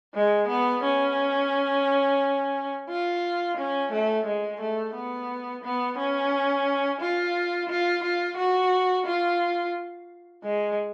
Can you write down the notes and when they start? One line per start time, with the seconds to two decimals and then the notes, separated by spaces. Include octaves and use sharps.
0.15 G#3
0.48 B3
0.83 C#4
2.89 F4
3.57 C#4
3.92 A3
4.26 G#3
4.61 A3
4.94 B3
5.64 B3
5.98 C#4
7.01 F4
7.70 F4
8.03 F4
8.37 F#4
9.06 F4
10.44 G#3